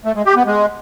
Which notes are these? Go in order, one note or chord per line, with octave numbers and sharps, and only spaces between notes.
A3
G#3
G4
B3
G#3